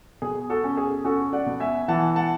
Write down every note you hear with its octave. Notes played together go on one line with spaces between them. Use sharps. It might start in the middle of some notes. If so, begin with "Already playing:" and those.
B2 G#4
F#4 A4
C#4
G#4
C#4 F#4 A4
D5 F#5
B2
E5 G#5
E3 F#5 A5
F#5 A5